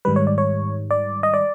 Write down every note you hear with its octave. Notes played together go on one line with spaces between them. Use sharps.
G#2 D#3 G3 B4
C#5
D5
C#5
D5
D#5
D5